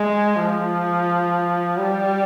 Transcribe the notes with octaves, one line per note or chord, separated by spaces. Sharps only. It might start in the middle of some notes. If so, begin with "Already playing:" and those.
Already playing: G#3
F3
G3